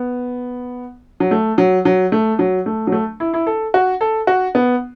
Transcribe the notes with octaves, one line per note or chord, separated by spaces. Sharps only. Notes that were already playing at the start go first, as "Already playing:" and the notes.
Already playing: B3
F#3
A3
F#3
F#3
A3
F#3
A3
F#3
A3
E4
E4
A4
F#4
A4
F#4
B3